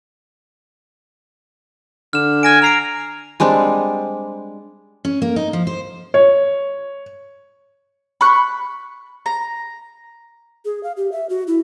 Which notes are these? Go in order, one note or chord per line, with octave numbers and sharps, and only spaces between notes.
D3 F6 E7
G#5 F6 A#6 D7
A#5 F6 C7 D7
G3 G#3 C4 D4
C#4
A#3
D#4
F3
C5
C#5
B5 C#6 F#6
A#5
G#4
F5
G4
E5
F#4
E4